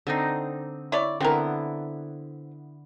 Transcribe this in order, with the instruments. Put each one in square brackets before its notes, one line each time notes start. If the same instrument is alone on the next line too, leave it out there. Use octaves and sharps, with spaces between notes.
[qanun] D3 C4 D#4
[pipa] E4 C#5 D5
[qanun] D3 B3 E4 [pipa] C4 A#4